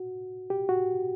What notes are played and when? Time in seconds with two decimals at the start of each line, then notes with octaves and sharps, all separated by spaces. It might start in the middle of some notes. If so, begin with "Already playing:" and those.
Already playing: F#4
0.50 G4
0.69 F#4